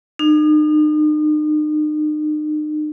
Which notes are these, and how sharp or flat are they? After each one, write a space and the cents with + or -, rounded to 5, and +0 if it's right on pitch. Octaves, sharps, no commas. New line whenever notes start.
D#4 -40